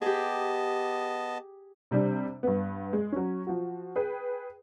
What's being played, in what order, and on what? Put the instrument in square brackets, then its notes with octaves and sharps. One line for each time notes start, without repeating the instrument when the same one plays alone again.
[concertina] B3 D#5 A5 [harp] G4 G#4
[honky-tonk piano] C3 G3 C4 D4
G2 B3
G#3
F#3 C#4
F3 F#4
G#4 B4 G5